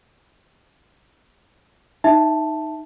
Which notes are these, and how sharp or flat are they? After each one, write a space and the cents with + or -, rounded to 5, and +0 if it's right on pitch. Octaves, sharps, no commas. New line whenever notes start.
D#4 +0 E5 +0 A5 +0